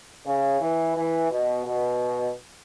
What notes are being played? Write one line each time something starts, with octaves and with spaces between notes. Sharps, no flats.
C#3
E3
E3
B2
B2